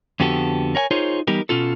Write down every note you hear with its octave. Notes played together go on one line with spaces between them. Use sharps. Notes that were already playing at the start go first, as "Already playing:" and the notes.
F2 D3 B3 F#4 G4 A4
A#4 C#5 G5 G#5
D#4 F4 G#4 A#4 C5 C#5
E3 G3 B3 D#4 G4 A#4
B2 C#4 F4 A4